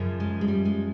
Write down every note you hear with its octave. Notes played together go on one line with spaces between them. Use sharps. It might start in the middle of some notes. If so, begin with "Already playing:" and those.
Already playing: F#2 C#3 F3
G#3
G#3
G3
G#3